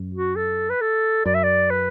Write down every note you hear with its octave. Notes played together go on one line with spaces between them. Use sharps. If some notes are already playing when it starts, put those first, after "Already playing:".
Already playing: F#2
F#4
A4
B4
A4
F#2 D5
E5
D5
B4